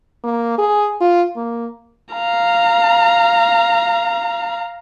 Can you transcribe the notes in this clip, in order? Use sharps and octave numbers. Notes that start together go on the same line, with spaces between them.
A#3
G#4
F4
A#3
F5 A#5